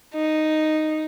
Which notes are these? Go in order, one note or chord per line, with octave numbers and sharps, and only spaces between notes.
D#4